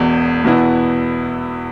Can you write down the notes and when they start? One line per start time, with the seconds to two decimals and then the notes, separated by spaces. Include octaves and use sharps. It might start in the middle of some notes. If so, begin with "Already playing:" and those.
Already playing: E1 E2 B2
0.44 E2 B2 B3 E4